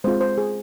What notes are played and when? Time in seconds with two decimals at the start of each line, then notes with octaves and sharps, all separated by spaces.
0.04 G#3 C4 F4 C5
0.21 C5
0.38 G#4